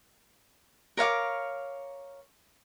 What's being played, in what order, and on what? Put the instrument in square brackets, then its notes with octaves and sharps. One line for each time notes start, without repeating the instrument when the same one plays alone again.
[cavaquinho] A#4 C#5 F5 D6